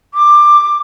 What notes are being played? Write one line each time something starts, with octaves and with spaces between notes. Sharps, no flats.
D6